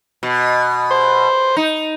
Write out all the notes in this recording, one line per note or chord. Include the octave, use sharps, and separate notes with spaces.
B2
C5
D#4